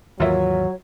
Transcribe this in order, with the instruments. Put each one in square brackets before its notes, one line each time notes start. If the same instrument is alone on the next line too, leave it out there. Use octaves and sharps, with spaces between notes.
[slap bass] D#2 G#2 E3 [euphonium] F#3 [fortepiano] F4 A#4 E5 [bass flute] C#5